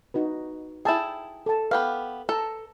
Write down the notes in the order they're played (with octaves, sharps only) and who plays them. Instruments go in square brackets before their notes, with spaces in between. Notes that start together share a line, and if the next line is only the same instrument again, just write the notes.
[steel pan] D#4 F#4 B4
[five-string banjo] E4 G#4 [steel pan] G5 A5 E6
[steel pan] A4 A5
[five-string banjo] B3 G4 F5 [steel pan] B4
[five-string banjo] A4 [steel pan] A5 A#5